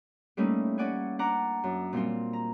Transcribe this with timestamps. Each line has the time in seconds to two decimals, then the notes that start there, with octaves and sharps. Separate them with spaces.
0.37 G3 A3 A#3 C#4 D#4 E4
0.78 C#4 D5 F#5 G#5
1.19 D4 F#5 A#5 D6
1.64 F#2
1.93 A#2 G3 A#3 C4 F4
2.33 A#5